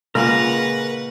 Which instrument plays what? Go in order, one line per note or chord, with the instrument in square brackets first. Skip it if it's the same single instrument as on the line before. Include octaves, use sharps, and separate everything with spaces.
[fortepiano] A#2 C#3 [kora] G#3 A#3 [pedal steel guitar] A#4 A#5 [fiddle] B4 F#5